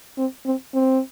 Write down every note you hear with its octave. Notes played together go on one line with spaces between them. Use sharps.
C4
C4
C4